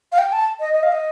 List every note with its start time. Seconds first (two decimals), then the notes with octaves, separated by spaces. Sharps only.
0.12 F5
0.18 G5
0.32 A5
0.60 D#5
0.74 D#5
0.83 F5
0.92 D#5